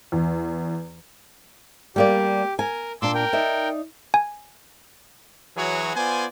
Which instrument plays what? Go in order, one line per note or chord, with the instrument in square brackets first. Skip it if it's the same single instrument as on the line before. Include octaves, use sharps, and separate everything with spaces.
[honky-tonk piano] E2
[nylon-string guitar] G3 A#3 D5 [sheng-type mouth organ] G4
[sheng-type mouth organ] A#4 [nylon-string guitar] G#5
[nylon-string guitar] A#2 D4 [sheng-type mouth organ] C6 D6 E6
[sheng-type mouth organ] A#4 G5
[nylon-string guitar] D#4 D5 E5
[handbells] G#5
[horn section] E3 F#3 E4 F#4 G#4 C#5
B3 F4 C5 D5 G#5